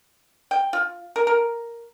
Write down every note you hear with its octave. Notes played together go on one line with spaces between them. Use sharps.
G5
F4
A#4
A#4